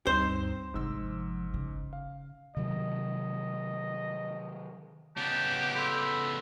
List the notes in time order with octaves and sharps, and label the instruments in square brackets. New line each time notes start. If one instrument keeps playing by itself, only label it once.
[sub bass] D2 [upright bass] G2 [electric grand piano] C4 D#4 E7 [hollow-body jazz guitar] C5
[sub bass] G1 [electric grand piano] G#2 E6 [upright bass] C3 F3
[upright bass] C#3
[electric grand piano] F5
[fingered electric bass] C3 D#3 F#3 [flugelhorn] D#5
[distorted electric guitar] C#3 B3 [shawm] G4 [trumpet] A5
[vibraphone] A4 C6 E6 [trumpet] B5